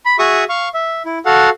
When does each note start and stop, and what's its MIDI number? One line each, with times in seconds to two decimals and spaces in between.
0.06 0.16 83
0.19 0.44 66
0.19 0.44 68
0.19 0.44 76
0.19 0.44 85
0.19 0.44 87
0.49 0.69 77
0.49 0.69 85
0.74 1.03 76
1.06 1.19 64
1.26 1.50 66
1.26 1.50 69
1.26 1.50 77
1.26 1.50 78